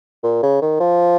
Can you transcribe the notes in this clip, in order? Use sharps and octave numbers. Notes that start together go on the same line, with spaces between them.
A#2
C#3
D#3
F3